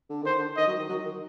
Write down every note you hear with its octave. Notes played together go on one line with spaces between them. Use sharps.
D3
D#3 C5
D3
D#3 D#5
F#3
D#3
F#3
D#3